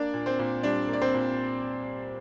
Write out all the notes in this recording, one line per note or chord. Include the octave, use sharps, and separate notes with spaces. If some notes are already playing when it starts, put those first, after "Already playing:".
Already playing: A#3 D4 D5
A#2
C4 C5
A#2
G3 D4 D5
A#3
D5
C4 C5
A#2